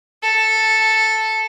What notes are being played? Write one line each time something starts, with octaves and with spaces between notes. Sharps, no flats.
A4